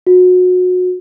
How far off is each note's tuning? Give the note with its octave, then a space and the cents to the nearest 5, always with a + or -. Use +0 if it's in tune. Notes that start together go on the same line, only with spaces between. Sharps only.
F#4 -25